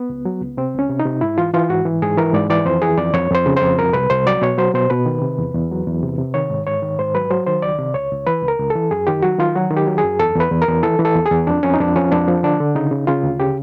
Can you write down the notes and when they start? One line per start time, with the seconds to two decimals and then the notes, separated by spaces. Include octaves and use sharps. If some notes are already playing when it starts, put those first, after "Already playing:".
Already playing: B3
0.09 C#2
0.25 F#3
0.42 C#2
0.57 C3 C4
0.74 C#2 C#4
0.89 C3
1.00 D#4
1.06 C3
1.21 G#2 E4
1.38 E3 F4
1.54 E3 F4
1.69 G#2 F#4
1.85 E3
2.02 G#2 G#4
2.17 E3 A#4
2.33 G#2 D5
2.50 E3 D5
2.65 F2 C5
2.82 E3 G#4
2.97 F2 D5
3.14 F2 C#5
3.31 F2 C5
3.46 C#3
3.57 F2 C5
3.78 C2 A#4
3.93 C2 B4
4.10 C2 C5
4.26 F#3 D5
4.42 B2 C#5
4.58 F#3 C5
4.74 B2 C5
4.90 B2 B4
5.06 D#3
5.22 C3
5.38 E2
5.54 E2
5.71 F#3
5.86 E2
6.03 C3
6.18 C3
6.34 D#3 C#5
6.50 G#2
6.67 G#2 C#5
6.82 D#3
6.99 G#2 C5
7.15 F#3 B4
7.30 F#3 C5
7.47 D#3 C5
7.62 C#2 D5
7.78 C3
7.94 C#2 C#5
8.11 C#2
8.27 E3 B4
8.42 C#2
8.48 A#4
8.59 C#2
8.70 A4
8.76 E3
8.91 F#2 G#4
9.07 D#3 G4
9.22 F#3 F#4
9.39 D#3 F4
9.55 F#3 F#4
9.71 D#3
9.76 G4
9.87 F#3
9.98 G#4
10.04 F#2
10.19 E2 A4
10.35 E2 B4
10.52 E2
10.62 A#4
10.68 E2
10.83 E3 A4
10.99 E3
11.05 A4
11.15 E2
11.26 G#4
11.31 E2
11.47 F2 D4
11.63 F2 C#4
11.74 D#4
11.80 F2 D4
11.96 F3 C#4
12.12 F2 D4
12.28 F3
12.43 D3 D4
12.60 D3
12.75 C#3 D#4
12.91 C#3
13.07 C#3 F4
13.23 D2
13.40 C#3 G4